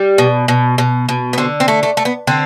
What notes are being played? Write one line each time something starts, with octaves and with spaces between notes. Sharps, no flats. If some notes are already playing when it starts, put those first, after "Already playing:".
Already playing: G3
B2
B2
B2
B2
B3
D3 C4
C4
A3
A3
A3
B3
D3 C4